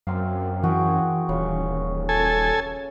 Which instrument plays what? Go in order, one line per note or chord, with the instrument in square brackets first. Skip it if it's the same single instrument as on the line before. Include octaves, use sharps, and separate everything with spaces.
[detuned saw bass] F#2 [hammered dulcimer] A#3 C4 F5
[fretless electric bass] E3 [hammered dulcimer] F#4 G#4 G5
[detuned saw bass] D#1 [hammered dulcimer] C#3
[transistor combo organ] A4 G#5